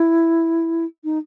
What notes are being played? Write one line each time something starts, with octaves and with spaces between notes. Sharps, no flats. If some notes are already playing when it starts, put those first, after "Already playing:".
Already playing: E4
D#4